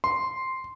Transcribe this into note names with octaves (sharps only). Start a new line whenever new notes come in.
C6